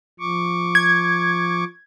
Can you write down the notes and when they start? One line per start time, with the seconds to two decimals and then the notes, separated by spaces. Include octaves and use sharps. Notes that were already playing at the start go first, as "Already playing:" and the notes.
0.19 F3 C#6 D6
0.75 G#6